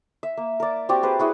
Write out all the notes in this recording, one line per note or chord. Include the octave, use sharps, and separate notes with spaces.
E5
A#3
A#4 D5
C4 F#4 G4 D5
G#4 B4 C5
E4 F#4 G#4